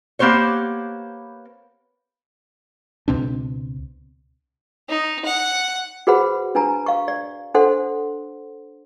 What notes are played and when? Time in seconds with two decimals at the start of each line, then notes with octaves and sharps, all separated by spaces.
0.19 A#3 B3 G4 C5 C#5
3.08 C#2 B2 C4 D4
4.89 D#4
5.25 F#5
6.07 F#4 G#4 B4 C5 F#5 B5
6.55 D4 B4 G#5 A#5
6.86 F5 C#6
7.08 D5
7.54 D4 A4 C5 F#5 C6